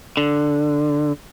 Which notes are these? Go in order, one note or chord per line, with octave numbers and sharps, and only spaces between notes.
D3